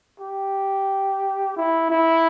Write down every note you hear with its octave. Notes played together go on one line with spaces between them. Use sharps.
G4
E4
E4